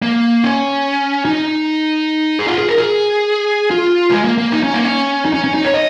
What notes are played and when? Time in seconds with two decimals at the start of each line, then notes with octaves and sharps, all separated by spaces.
0.02 A#3
0.44 C#4
1.25 D#4
2.39 G#4
2.48 F4
2.58 G#4
2.69 A#4
2.78 G#4
3.71 F4
4.11 G#3
4.25 A#3
4.38 A#3
4.52 D#4
4.63 C#4
4.74 A#3
4.85 C#4
5.25 D#4
5.34 C#4
5.44 C#4
5.54 D#4
5.64 C#5
5.74 D#5